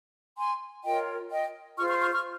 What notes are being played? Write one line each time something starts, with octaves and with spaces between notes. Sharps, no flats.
G#5 C6
F4 A#4 C#5 D#5 G5
D#5 G5
F4 G#4 C5 C#6 F6
C#6 F6
C#6 F6
C#6 F6